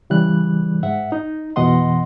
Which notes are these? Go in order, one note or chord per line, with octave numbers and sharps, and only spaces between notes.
C#3 E3 G3 F#6
G#2 E5 F#5
D#4
F2 B2 E3 D#5 F#5 C6